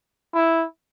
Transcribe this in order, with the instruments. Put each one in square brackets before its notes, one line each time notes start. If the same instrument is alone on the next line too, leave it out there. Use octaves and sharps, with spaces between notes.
[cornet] E4